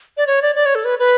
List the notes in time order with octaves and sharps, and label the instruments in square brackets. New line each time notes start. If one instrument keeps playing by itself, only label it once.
[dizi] D5
C#5
D5
D5
C#5
A4
B4
B4